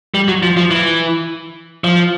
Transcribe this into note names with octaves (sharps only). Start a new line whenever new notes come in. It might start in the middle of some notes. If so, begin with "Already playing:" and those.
G3
F#3
F3
F3
E3
F3